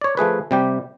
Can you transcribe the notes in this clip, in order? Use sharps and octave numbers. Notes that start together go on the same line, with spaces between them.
C#5 D5
F3 A3 G#4 B4
C3 G3 G4